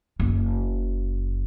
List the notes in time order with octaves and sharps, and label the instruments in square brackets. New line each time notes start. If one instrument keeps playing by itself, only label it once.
[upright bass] F#1 A#3